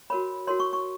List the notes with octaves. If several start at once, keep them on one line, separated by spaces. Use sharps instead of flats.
F#4 A#4 C#5 B5
F#4 A#4 C#5 C6
C#6
C#6